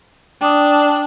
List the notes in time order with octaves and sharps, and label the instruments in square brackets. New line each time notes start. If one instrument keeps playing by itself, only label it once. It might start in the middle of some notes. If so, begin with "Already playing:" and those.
[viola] D4 [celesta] G5 D6 D#6